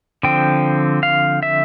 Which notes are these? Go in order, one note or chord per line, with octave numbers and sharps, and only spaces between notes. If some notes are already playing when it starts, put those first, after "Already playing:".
D3 F3 C4 G5
F5
E5